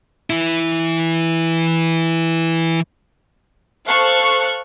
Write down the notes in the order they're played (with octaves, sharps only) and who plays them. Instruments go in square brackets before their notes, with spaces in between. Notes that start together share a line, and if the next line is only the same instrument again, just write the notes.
[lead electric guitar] E3 E4
[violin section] A4 C5 F5 C#6 F#6